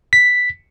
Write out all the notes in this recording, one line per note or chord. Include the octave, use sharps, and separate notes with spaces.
B6